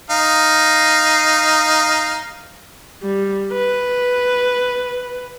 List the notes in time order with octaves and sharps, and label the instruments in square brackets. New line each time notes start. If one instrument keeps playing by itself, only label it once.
[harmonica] D#4 F5
[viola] G3
B4